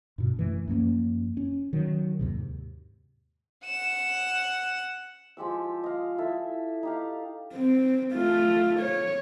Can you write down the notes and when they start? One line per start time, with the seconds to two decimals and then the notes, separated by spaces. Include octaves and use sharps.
0.18 G2 B2
0.37 F#2 E3 A3
0.68 F#2 F3 A#3 C#4
1.37 C#4
1.73 D#3 F#3
2.19 D#2 G#2 C3
3.66 F#5 E7
5.37 F3 G#3 G4 E6
5.83 D#5 F5
6.18 E4 A4 E5
6.83 D#4 G4 F5
7.54 C4
8.13 A3 F4
8.80 C#5